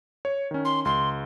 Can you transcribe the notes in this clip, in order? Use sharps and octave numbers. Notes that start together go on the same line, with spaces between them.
C#5
D#3 C#4
C6
C#2 C6